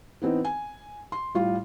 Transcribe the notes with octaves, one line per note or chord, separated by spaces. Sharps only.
E3 B3 C4 D#4
G#5
C6
A2 G3 F4